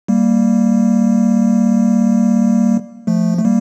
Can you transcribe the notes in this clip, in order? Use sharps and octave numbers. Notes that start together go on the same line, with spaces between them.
G3 A#3
F3 A3
A3
G3 A#3